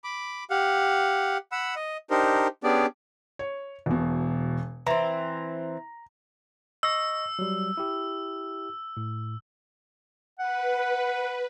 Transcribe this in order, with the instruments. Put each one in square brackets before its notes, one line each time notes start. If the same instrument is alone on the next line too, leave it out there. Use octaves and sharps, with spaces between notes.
[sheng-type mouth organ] B5 D6
G4 F5 F#5
F#5 B5 E6
D#5
D4 D#4 G4 A#4 C5
B3 C#4 D4 G4 G#4 D5
[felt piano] C#5
E1 B2
[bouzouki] E3 C4 [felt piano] A#5
[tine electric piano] D#5 C#6 A#6 [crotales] E6
[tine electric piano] F#3 G3
E4 G4
A2
[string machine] B4 [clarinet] F#5